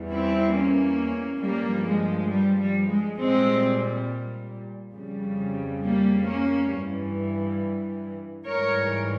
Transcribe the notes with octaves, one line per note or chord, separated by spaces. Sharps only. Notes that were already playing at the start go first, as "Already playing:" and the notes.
Already playing: E2 E3 G3
C4 E4
A#3 C#4
G2 F3 G3 A#3
G#3
G3
G3
G#3
A#2 G3 G#3 C4
F2 C#3 G3
G3 A#3
A#3 C#4
G2 E3 G3
G#2 E3 G3 A#4 C#5